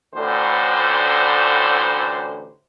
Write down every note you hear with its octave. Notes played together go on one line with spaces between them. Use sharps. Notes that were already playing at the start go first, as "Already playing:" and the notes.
A1 D2 A2 D3 C5